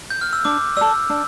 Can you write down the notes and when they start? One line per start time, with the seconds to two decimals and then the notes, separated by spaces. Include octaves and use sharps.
0.10 G6
0.21 F6
0.33 E6
0.45 D4 D6
0.77 A4 D5 E6
1.10 D4